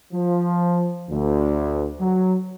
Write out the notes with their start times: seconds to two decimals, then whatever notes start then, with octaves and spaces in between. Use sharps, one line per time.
0.13 F3
1.10 D2
2.00 F#3